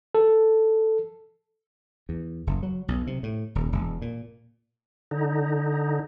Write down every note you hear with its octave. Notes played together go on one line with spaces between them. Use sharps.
A4
E2
F#1
F#3
B1
C3
A2
D#1
E1
A#2
D3 D#4